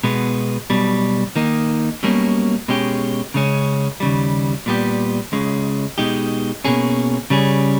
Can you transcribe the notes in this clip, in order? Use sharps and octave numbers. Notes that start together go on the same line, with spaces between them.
B2 G#3 B3
B1 B2 G3
D#3 A#3 D#4
B1 B2 G3 A#3 C#4
B2 G#3 C#4 G4
C#3 G#3 C#4
D#2 C#3 G3
A#2 G3 B3 G4
C#2 C#3 G#3
B2 G#3 D#4 G4
B2 A#3 C#4 G#4
C#3 G3 C#4 G#4